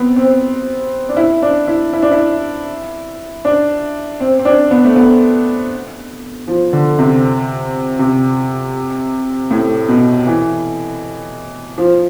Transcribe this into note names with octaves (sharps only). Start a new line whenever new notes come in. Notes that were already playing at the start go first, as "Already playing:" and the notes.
Already playing: B3 C4
C4
D4
E4
D4
E4
E4
D4
E4
D4
C4
C4
D4
B3
A3
B3
F3
D3
C3
C3
A2
B2
E3
F3